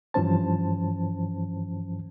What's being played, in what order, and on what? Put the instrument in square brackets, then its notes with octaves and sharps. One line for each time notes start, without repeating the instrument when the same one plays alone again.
[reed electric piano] G2 E3 F3 C#4 C5 A5